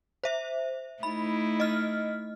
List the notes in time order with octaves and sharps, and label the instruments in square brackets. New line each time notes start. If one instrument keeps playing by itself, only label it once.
[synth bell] C5 E5
[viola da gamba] A3 D#4 E4 [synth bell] B5
[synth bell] D#5 F6